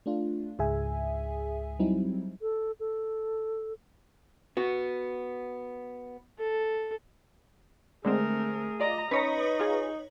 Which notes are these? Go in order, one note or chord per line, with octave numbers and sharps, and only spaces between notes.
A3 D4 F4
C#2 G#2 G#4 E5 G#5
F#3 G3 C4 D#4 E4
A4
A4
B3 F#4
A4
D3 G#3 A3 C4 G#4 A#4
F4 D5 D#5 A#5
C#4 D#4 B4 C#5 D#5 A#5
F4 G#4